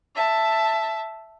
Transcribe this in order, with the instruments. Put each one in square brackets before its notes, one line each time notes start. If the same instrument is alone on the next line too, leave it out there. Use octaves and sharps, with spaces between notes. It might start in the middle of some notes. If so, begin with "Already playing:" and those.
[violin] E5 A5